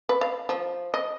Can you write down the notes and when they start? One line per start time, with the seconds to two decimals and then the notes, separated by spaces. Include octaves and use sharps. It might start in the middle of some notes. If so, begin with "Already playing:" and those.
0.09 B4
0.21 F5
0.49 F3
0.94 D#5